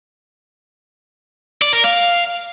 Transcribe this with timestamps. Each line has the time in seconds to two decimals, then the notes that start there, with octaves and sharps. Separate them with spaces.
1.62 D5
1.73 A#4
1.84 F5